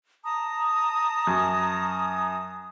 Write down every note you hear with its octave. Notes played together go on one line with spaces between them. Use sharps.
A5 A#5 D#6
F#2